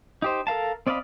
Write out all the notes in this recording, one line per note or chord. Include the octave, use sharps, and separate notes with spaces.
D#4 G4 C5
A4 A#4 F5 A5
C4 D5 D#5 F5 B5